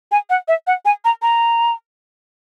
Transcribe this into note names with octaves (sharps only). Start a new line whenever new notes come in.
G#5
F#5
E5
F#5
G#5
A#5
A#5